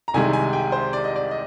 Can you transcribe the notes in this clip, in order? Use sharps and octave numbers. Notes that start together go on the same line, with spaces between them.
A#5
C2 C3 D#3 G#3 G#5
G#5
G5
C5
D5
D#5
D5
D#5